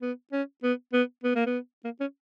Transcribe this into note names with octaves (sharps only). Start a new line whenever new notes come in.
B3
C#4
B3
B3
B3
A#3
B3
A#3
C#4